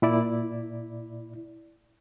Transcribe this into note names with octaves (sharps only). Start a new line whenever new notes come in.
A#2 E4 D5